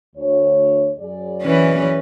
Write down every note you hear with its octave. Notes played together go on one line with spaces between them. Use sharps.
D2 C#5
F#2 G#4 D5
E3 C#4 B4